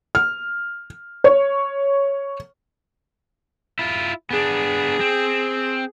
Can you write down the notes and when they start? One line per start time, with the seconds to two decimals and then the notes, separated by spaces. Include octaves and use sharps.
0.15 F6
1.24 C#5
3.79 E4 F4
4.31 B3 D4 G#4
5.01 C4